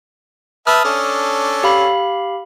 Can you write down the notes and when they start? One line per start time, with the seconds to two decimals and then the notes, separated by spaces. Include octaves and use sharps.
0.67 B4 E5 A5 D#6 F6
0.85 C#4 D4 A4
1.63 G4 F5 B5